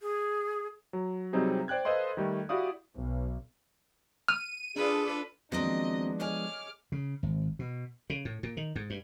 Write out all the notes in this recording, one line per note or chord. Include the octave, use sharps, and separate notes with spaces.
G#4
F#3
C3 F#3 G3 C4 D#4 G#4
C5 D5 G5 F#6 G#6
A4 B4 C5 D#5 F5 C6
D#3 G3 A3
E4 F#4 G4 D5 F5 D#6
B1
F6 D#7
D4 F4 G#4 A4 B4
D#2 F3 F#3 G#3 B3 C4 D4 D#5
G#4 C#5 D#5 D6 F6
C#3
G#1
B2
C#3
A2
A#2
D#3
G#2
G2